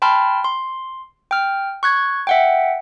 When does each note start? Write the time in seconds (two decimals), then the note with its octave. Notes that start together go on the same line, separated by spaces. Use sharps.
0.02 G5 A5 B5 C6 F6
0.44 C6
1.31 G5 F6
1.83 C#6 F#6 G#6
2.27 E5 F#5 G5